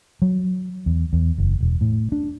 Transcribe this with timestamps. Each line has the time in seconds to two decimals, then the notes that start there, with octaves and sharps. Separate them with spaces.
0.22 F#3
0.86 E2
1.13 E2
1.38 F#1
1.61 E1
1.81 A2
2.12 D4